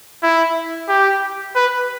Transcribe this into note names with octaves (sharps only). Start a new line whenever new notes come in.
E4
G4
B4